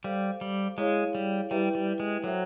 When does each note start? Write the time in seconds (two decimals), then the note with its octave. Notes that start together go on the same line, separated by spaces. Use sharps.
0.04 G3 A4 C5 F5
0.41 G3
0.78 G#3 E4 G#4 C#5 F5
1.15 G3
1.51 G3 E4 G4 B4 E5 G5
1.75 G3
2.00 G#3
2.24 F#3 A4 C5 E5 G5